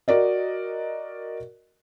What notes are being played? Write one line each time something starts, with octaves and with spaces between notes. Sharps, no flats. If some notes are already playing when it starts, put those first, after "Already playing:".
F#4 A#4 D5 D#5